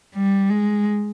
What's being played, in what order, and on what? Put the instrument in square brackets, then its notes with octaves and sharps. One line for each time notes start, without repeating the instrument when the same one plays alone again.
[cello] G3
G#3